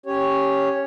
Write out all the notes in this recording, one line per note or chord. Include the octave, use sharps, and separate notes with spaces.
C#4 G4 C#5